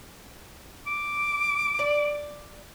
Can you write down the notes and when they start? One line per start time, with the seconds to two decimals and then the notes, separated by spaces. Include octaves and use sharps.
0.87 D6
1.79 D5